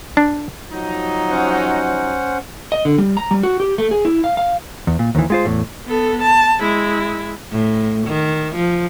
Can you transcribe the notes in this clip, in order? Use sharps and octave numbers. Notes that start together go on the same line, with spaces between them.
D4
F3 F#3 D#4
C#4 C5 F#5
D#5
D3
G3
A#5
G3
F#4
G4
A3
G#4
E4
F5
F5
E2
A#2
D#2 D#3 E3
G#3 F4 C5
E2 A2
B3 A4
A5
G#3 E4
A2
D#3
F3